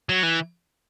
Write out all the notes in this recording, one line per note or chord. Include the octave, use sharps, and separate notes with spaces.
F#3
E3